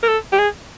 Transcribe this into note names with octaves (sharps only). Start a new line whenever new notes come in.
A#4
A4
G4
G#4